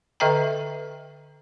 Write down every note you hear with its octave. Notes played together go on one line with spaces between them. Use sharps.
D3 A4 D#5 E5 G5 A#5